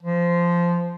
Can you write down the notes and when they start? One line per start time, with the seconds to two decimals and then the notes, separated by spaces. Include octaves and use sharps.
0.03 F3